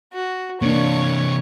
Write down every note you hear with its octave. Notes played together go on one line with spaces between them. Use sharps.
F#4
C3 E3 A#3 D4 C#5 C#6